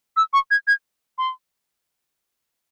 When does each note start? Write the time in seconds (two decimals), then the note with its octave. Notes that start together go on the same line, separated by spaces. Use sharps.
0.17 E6
0.33 C#6
0.51 G#6
0.67 G#6
1.18 C6